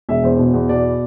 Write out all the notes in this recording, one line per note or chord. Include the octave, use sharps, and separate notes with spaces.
E1 E5
E2 C5
B2
E2
B2 D5